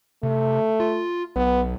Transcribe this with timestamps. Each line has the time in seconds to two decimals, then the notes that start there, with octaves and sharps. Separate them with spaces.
0.23 C3 A3
0.80 F4
1.36 B1 B3